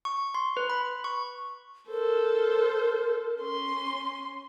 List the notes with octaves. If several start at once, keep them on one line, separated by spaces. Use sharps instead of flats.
C#6
C6
B4
B5
C#6
A4 A#4 C5
C#4 C6